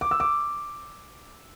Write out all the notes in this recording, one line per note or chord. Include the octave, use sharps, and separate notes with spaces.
D6
E6
D6